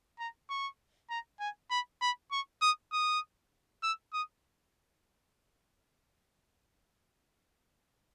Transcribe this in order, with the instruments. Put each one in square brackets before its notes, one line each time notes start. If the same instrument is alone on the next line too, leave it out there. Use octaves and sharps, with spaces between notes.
[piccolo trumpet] A#5
C#6
A#5
G#5
B5
B5
C#6
D#6
D#6
E6
D#6